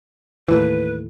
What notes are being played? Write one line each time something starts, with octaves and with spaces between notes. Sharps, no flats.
D#2 A2 E3 B4